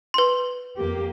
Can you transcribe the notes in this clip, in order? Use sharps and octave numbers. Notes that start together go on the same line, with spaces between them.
B4 C6
F2 A#3 G4